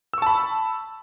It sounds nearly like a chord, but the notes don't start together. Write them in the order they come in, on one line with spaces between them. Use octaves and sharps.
E6 C#6 A5 B5